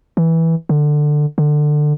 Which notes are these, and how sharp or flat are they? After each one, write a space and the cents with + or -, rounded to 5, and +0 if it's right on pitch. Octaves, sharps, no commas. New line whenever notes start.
E3 -10
D3 +15
D3 +20